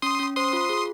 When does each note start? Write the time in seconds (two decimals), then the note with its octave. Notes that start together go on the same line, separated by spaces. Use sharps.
0.02 C#4 C6 D#6
0.20 C#4
0.36 C5 C6 D#6
0.53 F4
0.69 G#4